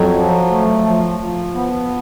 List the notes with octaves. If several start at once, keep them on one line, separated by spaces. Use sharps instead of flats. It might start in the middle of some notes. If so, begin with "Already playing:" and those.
Already playing: F2 F#3
F3
A3
F3
F3
B3